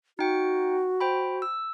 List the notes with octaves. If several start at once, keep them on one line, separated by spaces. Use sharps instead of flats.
D#4 F#4 G5 C#7
C5 G5 B5
E6